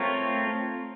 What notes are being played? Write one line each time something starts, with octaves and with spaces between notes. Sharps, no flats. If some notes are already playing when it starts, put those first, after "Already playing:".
Already playing: A3 C4 F4 A#4 C#5